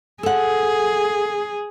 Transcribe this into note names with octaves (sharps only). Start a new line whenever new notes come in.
G#4 A4 F#5